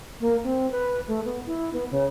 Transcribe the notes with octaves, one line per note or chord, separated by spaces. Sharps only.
A#3
C4
B4
A3
B3
E4
B3
C#3